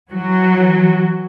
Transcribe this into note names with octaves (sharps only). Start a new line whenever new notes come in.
E3 F#3 F#4